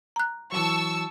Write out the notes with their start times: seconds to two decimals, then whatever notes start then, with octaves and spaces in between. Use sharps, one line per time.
0.16 A#5 F#6
0.52 E3 F#3 A5 C#6 E6